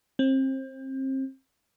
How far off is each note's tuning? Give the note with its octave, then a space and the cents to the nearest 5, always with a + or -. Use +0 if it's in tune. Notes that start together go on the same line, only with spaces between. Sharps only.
C4 +30